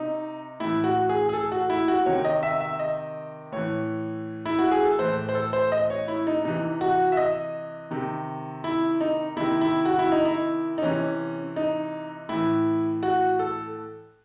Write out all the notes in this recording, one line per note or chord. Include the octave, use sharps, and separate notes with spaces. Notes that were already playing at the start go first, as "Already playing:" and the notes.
Already playing: C3 D#4
A2 E3 E4
F#4
G#4
G#4
A4
F#4
E4
F#4
C3 D#3 C#5
D#5
E5
E5
D#5
A2 E3 C#5
E4
F#4
G#4
A4
A2 E3 C5
C5
A4
C5
D#5
C#5
E4
D#4
C3 E3 D#4
F#4
E5
D#5
C3 D#3
E4
D#4
C3 D#3 E4
E4
F#4
E4
D#4
E4
D#4
C3 E3 C#4
D#4
A2 E3 E4
F#4
A4